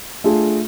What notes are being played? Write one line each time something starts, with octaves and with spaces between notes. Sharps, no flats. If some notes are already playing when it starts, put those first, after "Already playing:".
A3 D4 F4 G#4